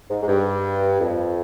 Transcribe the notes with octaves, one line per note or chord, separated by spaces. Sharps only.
G#2
G#2
G2
F2